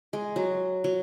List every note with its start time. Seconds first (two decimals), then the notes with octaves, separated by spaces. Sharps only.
0.13 G#3
0.36 F#3
0.84 F#3